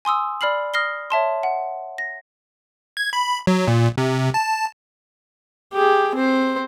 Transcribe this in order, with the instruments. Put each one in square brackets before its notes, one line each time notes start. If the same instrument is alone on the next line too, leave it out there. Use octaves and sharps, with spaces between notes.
[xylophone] G#5 C6 D#6 E6
D5 B5 F6 C7 F#7
D#6 F6 A#6 C7 G7
C#5 E5 A5 C6
F#5
A#6
[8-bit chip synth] G#6
B5
F#3
A#2
C3
A5
[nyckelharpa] G4 G#4
C4 C5